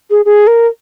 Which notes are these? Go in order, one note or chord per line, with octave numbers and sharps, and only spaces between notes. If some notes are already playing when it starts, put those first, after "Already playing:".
G#4
G#4
A#4